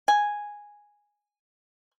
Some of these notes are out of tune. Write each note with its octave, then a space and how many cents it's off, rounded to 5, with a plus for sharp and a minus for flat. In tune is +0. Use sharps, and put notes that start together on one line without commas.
G#5 -5